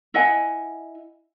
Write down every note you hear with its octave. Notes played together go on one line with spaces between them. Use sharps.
E4 D#5 F#5 G#5